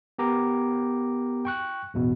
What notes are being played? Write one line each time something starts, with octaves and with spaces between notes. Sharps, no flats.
B3 G4 A#4 G5 A#5 D6
G5 C#6 F#6
A1 E2 B2